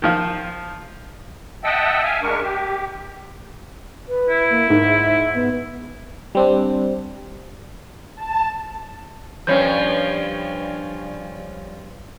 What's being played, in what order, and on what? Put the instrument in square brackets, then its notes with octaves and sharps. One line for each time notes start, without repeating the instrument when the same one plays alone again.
[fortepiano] D#3 F3 F4
[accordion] D#5 E5 F#5 G5 A5 E6
E5 F5 G#5
G#3 D4 A#4 C#6
G4
[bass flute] B4
[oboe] E4
[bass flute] A#3
[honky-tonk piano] G#2 [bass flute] A#4
[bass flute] E5
B3
[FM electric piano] G3 C4 D4
[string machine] A5
[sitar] G2 F3 [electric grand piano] C#4 C#5 G6